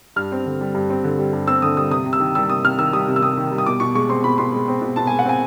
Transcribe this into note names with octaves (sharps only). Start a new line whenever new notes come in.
G2 F6
C4
D3
G3
G2
C4
D3
G3
G2
C4 E6
D3 D#6
G3 D#6
C3 D#6
C3
E6
D#3
G3 E6
C3 D#6
C3 F6
D#3 E6
G3 D#6
C3
E6
C3 D#6
D#3
G3
D#6
B2 D6
B2 C#6
G#3 C#6
C4 C6
B2 B5
B2 C6
G#3
C4
B2
B2 A5
G#5
G#3
F#5
C4 G#5